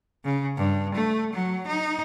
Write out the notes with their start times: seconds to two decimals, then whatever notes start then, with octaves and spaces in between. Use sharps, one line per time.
0.25 C#3
0.57 G2
0.94 A3
1.33 F#3
1.67 D#4